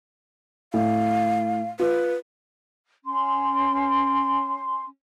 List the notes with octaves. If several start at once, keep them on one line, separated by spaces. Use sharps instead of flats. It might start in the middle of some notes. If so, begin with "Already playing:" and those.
A2 F5
F4 B4
C#4 C6